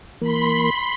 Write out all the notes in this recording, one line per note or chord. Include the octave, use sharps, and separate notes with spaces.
E3 A#3 A#4 B5 C6 C7